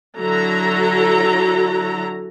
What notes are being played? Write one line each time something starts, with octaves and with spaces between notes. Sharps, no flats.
D3 F#3 E4 F#4 A4 A#5